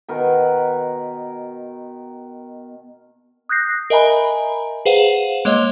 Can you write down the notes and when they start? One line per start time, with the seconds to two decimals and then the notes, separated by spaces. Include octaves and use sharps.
0.08 B2 D#3 A#4 B4
3.49 D#6 F#6 G6 A#6 C7
3.90 A#4 D#5 E5 G#5 A#5 B5
4.86 G#4 B4 C5 F5 F#5
5.45 G#3 A#3 C#5 D#5